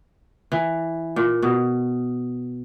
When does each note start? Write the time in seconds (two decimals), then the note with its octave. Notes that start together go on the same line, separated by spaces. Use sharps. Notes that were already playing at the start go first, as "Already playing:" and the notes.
0.52 E3
1.16 A#2
1.42 B2